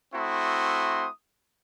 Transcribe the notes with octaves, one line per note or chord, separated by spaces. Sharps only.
A3 C4 E4 F#4 C6 D#6